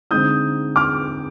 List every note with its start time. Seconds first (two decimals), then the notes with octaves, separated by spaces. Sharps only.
0.11 D3 G#3 C4 D#4 D#6 G6
0.76 D6 F6